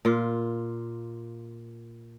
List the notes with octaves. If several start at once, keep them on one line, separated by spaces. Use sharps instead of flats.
A#2 F4